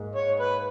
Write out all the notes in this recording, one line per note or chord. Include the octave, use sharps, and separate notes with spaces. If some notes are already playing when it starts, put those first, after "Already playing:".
Already playing: G#2 A#3
C#5
B4